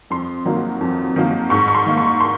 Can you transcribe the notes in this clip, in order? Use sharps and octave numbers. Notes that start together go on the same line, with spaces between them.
F2 C6
D#3 F#3 A#3
F2
D#3 F#3 A#3
G#2 C#6
C#6
C6
D#3 A#3
C#6
C6